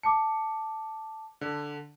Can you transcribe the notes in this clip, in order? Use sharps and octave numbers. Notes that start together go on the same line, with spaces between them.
A5 D6 C#7
D3